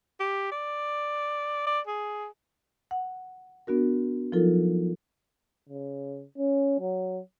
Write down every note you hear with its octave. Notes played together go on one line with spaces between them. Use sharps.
G4
D5
D5
G#4
F#5
B3 D4 F#4 A#4
F3 F#3 D#4 F4 A4 A#4
C#3
C#4
F#3